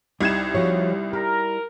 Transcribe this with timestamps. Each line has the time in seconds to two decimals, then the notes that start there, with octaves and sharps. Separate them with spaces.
0.21 C2 G3 D#4 E4 G#6 E7
0.55 F3 F#4 C#5
1.13 G4 A#4